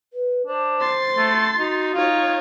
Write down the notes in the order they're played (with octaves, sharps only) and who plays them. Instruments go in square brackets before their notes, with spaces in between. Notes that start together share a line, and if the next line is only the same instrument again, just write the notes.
[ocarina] B4
[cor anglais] D4 [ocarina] C5
[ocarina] C5 [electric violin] C6 A6
[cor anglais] A3
[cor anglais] D#4 [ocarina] F#4
[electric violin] D#4 C#5 [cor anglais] F4